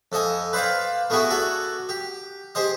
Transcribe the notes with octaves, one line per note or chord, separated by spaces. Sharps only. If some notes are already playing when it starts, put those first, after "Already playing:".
F2 A4 D#5 G#5
B4 C5 D5 F5 G5
A3 B3 E4 F#4 G#4
F#4 A4 D5 G#5
G4
G4 G#4 C5 D#5